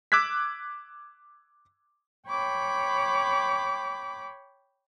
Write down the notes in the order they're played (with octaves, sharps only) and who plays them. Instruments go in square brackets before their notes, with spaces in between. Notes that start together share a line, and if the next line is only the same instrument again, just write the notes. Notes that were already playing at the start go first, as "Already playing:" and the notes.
[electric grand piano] D6 E6 F#6 G#6 B6
[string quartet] C#5 G5 B5 D6